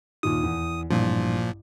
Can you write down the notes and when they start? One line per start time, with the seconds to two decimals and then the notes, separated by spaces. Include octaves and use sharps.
0.23 D#2 A#2 D#3 D#6
0.43 E2
0.91 A1 G2 A#2 F3